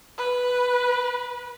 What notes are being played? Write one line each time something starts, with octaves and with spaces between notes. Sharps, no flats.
B4